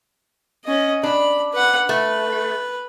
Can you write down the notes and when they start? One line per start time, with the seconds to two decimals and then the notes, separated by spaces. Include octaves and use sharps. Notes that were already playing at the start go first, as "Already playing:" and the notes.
0.64 C#4 D#5
1.03 D4 B5
1.53 B4 F#5
1.89 A3 B4